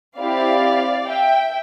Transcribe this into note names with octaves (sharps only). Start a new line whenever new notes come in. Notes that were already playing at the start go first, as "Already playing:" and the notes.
C4 E4 G4 D5 F5
E5 G5